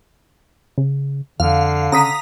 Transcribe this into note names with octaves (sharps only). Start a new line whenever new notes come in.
C#3
F2 D3 F5
C#3 A#5 D#6 B6